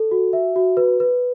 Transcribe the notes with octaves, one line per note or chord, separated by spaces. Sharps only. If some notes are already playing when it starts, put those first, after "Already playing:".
Already playing: A4
F#4
E5
F#4
B4
B4